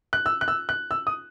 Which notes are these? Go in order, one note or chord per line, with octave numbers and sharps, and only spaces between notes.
F#6
E6
F#6
E6
F#6
E6
D#6